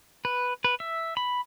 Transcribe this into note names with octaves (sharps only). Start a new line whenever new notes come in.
B4
B4
E5
B5